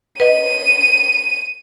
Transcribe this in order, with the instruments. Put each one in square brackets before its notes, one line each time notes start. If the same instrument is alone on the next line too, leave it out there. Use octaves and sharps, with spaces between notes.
[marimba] B4 D#5 [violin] D#7